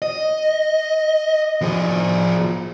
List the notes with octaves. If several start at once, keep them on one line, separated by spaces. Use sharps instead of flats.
D#5
F3 G#4